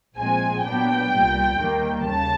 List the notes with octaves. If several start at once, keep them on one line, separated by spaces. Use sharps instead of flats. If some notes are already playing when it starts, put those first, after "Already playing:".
A#1 A#2 F3 G#3 C4 G#5
A#2 F#3 B3 D4 G5
C2 A#2 G3
D#2 D#3 G3 A#3
D#2 C#3 A5